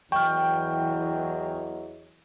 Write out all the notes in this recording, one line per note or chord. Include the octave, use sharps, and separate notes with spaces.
E2 E3 F#3 D#5 G5 C#6 F6